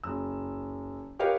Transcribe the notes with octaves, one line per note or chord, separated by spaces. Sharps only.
F#1 E6
G4 A#4 B4 C#5 D#5 F5